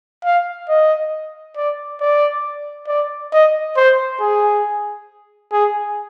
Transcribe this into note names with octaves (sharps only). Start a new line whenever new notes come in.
F5
D#5
D5
D5
D5
D#5
C5
G#4
G#4